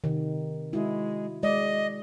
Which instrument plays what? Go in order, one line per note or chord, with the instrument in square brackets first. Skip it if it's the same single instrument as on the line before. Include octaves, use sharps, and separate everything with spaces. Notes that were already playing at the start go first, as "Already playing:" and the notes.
[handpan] C3 D#3
[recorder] G#3 [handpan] E4 F#4
[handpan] G#3 D5 [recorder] D#5